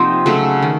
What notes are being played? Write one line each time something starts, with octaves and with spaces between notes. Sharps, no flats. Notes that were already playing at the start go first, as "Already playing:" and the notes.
Already playing: C3 F3 A#3 C4 D#4 F#5
C#3 F#3 A3
D#3